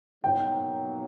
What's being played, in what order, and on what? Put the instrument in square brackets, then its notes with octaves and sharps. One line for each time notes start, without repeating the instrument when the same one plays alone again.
[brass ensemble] B2 F#3 A#3 D#4 [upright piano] G5